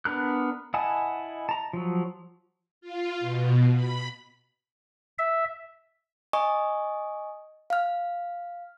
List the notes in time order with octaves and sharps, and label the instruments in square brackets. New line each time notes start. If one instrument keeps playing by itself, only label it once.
[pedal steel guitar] B3 D4 A#4 F#6
E4 D#5 F#5 G#5 A5
A5 A#5
F3 F#3
[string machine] F4
B2
B5
[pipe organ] E5
[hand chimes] D#5 G#5 C#6 D#6
F5 F6